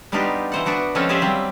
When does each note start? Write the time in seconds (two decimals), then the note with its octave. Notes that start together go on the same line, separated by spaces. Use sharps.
0.12 G3 B3 D4 D#4 F4 G4
0.52 E3 C5 F#5
0.66 B3 D4 F#4
0.95 F3 G#3 C4 C#4 F4 A4
1.09 G4 G#4 C5 D5 E5 F5
1.21 F#3 G3 C4